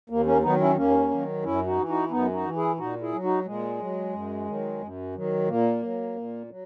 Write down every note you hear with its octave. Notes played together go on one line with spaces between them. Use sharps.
D#2 A#3
A#3 C#4
D#3 F#3 B3 D#4
C#4 E4
D#2 A#3 C#4
D#3 F#3
F#2 C#4 E4
D#4 F#4
E3
D#4 F#4
F#2 B3 D#4
D#4 F#4
E3
E4 G#4
A#2 D#4 F#4
E4 G#4
F#3
D#4 F#4
A#2 G#3
F#3
F#2
D#3 F#3
F#2
D#3 F#3
A#2 A#3
F#3
A#2
F#3